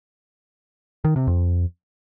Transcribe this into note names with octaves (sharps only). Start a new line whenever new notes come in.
D#3
C3
F2